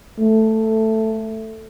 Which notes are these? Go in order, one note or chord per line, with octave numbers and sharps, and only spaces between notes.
A3